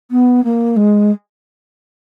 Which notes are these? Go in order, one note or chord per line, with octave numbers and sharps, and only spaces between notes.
B3
A#3
G#3